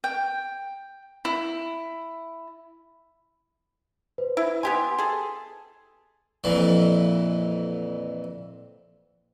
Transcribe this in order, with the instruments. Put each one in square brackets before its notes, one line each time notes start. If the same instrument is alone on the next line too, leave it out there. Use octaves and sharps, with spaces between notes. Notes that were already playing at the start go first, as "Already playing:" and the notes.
[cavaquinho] G5
E4
[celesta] B4 C5
[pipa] E4
[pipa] B3 G4 G#5 [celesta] C6
[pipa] G#4 A4
[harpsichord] F2 A#2 E3